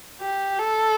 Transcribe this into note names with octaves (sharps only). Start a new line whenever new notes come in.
G4
A4